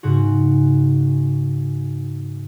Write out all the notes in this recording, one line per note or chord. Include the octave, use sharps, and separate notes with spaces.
G#2 C#3 F#4